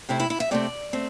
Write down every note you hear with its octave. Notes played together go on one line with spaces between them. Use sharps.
C3 A3 C4 E4
E4
E4
E5
C3 A3 C4 D5
A3 C4